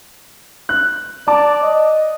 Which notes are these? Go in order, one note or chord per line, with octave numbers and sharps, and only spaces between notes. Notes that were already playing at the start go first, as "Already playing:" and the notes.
F#6
D5 A5 D6
D#5